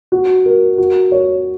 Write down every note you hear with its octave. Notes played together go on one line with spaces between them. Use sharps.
F#4
A#4
F#4
C#5